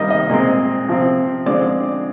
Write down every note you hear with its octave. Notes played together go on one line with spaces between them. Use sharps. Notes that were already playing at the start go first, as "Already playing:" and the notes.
Already playing: C3 D#3 G3 A#3 D#5
D#5
A#2 G#3 C4
C3 F3 C4
D3 F3 G#3 C4 D5